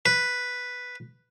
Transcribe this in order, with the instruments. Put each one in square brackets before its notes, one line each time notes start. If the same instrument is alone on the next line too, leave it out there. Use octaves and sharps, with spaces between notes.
[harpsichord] B4